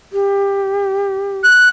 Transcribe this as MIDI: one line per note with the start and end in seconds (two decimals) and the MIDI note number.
0.13 1.40 67
1.43 1.68 90